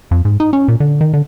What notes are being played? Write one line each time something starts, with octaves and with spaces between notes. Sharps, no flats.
F2
G#2
D#4
C#4
A#2
D3
D#3
D3